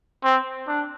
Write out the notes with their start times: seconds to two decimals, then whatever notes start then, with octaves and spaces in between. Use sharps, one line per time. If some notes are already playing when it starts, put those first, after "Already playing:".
0.24 C4
0.68 D4